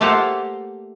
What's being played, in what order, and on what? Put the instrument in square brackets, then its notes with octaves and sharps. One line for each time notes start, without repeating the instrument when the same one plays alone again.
[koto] A3 A#3 F4 G4 C5 F#5